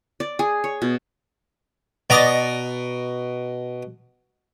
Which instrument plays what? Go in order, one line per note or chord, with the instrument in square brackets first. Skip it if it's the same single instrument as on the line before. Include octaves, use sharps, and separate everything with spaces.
[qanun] D5
G#4
C#5
B2
[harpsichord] B2 A#5 [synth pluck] D5 D#5 A6